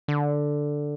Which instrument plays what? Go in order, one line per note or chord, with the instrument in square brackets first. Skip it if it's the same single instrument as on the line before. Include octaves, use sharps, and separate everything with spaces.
[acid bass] D3